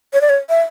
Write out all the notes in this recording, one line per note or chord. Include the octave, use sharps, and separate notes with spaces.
C#5
D5
C#5
E5